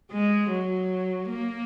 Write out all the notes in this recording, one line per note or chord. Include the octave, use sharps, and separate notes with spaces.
G#3
F#3
A#3